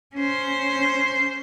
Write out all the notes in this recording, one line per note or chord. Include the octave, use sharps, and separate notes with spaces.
C#4 C5